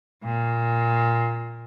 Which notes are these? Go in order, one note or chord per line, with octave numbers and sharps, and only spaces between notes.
A#2